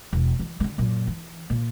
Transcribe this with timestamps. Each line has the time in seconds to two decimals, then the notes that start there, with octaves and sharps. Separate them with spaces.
0.13 E1
0.39 E3
0.60 G2 D3
0.78 F#2 A#2
1.07 E3
1.50 A#2